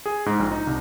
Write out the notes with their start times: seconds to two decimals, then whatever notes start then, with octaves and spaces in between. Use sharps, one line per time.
0.06 G#4
0.26 G#2
0.39 A#1
0.52 D#4
0.67 C2